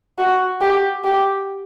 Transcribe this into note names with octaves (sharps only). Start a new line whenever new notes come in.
F#4
G4
G4